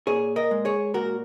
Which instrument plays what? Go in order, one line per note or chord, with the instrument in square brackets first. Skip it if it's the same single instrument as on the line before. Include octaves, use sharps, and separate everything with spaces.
[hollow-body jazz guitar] A#2 G#4 C#5
A#4 D#5
G#3
G#4 C#5
A#2 F#4 A#4